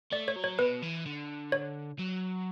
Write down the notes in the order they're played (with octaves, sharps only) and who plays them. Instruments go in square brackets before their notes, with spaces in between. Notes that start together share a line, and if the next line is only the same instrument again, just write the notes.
[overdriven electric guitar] A3 [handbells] D5
[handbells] C#5
[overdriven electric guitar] F#3
[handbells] C#5
[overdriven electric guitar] B2 [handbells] B4
[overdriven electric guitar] E3
D3
[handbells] C#5
[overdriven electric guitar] F#3